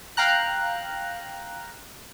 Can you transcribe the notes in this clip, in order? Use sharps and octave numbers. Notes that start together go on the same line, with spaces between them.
F5 G5 A#5 F#6